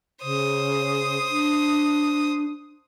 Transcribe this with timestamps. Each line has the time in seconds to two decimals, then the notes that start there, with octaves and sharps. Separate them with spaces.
0.22 C#3 C5 D#6
1.31 D4